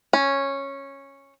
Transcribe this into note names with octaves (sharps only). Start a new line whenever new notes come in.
C#4